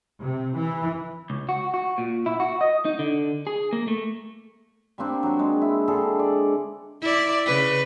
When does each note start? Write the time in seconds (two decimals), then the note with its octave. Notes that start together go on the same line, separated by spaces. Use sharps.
0.20 C3
0.56 E3
1.30 C#2
1.49 F#4
1.74 F#4
1.98 A#2
2.26 E4
2.40 F#4
2.61 D#5
2.85 D#4
2.99 D3
3.47 G#4
3.73 A#3
3.88 A3
4.98 G3 A#3 C4 D4
5.23 F#3 F#4
5.39 G#3
5.62 E4
5.88 D3 G#3 G#4 A4
6.19 D5
7.01 E4 D5
7.46 C#3 B4